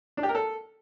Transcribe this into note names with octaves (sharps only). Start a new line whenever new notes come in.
D4
G4
A#4
A4